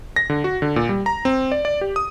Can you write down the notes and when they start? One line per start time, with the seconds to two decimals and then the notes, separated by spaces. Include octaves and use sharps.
0.16 A#6
0.30 D3
0.44 F#4
0.62 D3
0.76 A#2
0.89 G3
1.06 A#5
1.25 C4
1.52 D5
1.65 D5
1.81 G4
1.96 D#6